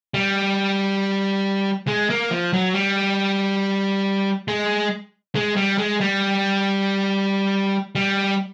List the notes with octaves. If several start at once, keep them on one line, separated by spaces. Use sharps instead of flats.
G3
G#3
A#3
F3
F#3
G3
G#3
G#3
G3
G#3
G3
G3